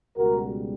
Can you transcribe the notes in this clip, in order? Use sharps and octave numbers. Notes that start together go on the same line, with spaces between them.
C#2 B2 G3 F#4 A#4